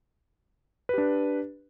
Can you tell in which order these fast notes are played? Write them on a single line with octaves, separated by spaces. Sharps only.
B4 G4 D4